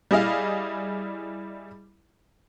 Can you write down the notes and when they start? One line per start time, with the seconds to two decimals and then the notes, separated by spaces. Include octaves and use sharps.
0.11 G3 E4 G#4 D#5 F5